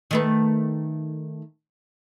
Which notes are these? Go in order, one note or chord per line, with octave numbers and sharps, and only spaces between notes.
D#3 A3 B4